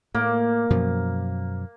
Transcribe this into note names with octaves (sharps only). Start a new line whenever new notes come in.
A2 A#3
F#2 B2 F3